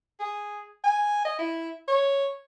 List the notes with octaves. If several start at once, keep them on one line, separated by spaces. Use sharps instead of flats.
G#4
G#5
D#5
E4
C#5